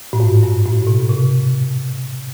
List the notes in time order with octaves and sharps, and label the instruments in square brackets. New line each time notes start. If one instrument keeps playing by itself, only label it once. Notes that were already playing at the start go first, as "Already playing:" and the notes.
[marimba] A2
G#2
G2
A2
B2
C3